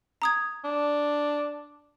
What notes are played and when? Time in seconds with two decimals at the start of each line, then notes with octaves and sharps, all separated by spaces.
0.22 A#5 D#6 G#6
0.65 D4